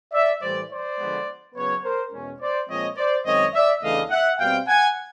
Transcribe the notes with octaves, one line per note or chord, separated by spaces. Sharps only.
D5 E5
A2 E3 G3 C5 D5
C5 D5
D3 F3 G#3 B3
C#3 F#3 B3 B4 C#5
A#4 C5
E2 B2 G#3 C#4
C5 D5
A#2 F3 G#3 C4 C#5 D#5
C5 D5
F#2 D#3 G#3 C4 C#5 D#5
D5 E5
E2 C#3 E3 A3 D4 D#5 F5
E5 F#5
B2 G3 C4 F5 G5
F#5 G#5